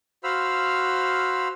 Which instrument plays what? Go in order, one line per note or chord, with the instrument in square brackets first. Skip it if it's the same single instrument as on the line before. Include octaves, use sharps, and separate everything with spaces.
[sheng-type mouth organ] F#4 C5 F5 B5 E6 F6